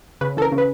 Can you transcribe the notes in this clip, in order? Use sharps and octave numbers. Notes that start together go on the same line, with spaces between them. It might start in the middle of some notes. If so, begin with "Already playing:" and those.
C#3 B4
E3 A4 A#4
C#3
B4